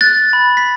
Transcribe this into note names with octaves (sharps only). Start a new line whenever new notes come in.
F#6 A6
B5
B6